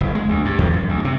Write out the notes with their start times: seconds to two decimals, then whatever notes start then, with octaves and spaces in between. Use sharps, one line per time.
0.01 F#1
0.15 G#3
0.29 D2
0.45 G2
0.59 E2
0.73 F#2
0.89 D2
1.05 C3